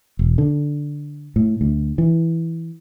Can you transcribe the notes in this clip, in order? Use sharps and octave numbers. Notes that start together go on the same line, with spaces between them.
E1
D3
A2
D2
E3